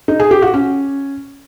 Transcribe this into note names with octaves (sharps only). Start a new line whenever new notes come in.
D#4
G#4
G4
F#4
C#4